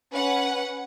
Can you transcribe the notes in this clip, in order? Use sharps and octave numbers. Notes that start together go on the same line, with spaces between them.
C#4 B4 F#5